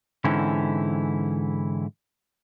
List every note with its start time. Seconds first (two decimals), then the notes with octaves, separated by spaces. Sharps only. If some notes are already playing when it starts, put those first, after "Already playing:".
0.24 G#2 D3 E3 C4 C#4 E4